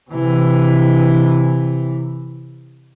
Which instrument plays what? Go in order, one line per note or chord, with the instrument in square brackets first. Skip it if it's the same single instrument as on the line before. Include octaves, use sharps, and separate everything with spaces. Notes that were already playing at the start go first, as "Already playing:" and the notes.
[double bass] C3 E3